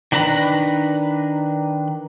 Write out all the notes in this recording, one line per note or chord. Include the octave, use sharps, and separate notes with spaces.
D#3 D4 B4 A#5 B5